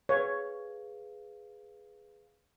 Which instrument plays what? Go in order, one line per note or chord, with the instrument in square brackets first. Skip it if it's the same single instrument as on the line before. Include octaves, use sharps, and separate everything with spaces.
[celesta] G#4 B4 F5 [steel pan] C#5